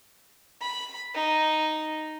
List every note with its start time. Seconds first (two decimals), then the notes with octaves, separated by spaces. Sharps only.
0.62 B5
1.15 D#4